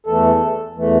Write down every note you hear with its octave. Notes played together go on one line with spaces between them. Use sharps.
E2 E3 A3 A4
E2 E3 A3